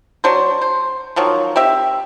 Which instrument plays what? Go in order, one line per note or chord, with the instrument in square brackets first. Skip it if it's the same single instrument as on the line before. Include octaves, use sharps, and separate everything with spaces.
[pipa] F#3 D4 C5
C5
D#3 F3 F#3
C4 G4 E5